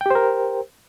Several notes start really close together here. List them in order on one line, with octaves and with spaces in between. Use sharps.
G5 G4 C5 A#4